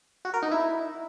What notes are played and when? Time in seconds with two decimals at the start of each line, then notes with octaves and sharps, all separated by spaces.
0.25 F#4
0.34 A#4
0.42 D#4
0.51 E4